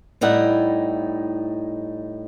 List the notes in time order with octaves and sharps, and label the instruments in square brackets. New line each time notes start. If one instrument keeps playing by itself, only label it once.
[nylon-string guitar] A2 G3 D#4 E4 F#5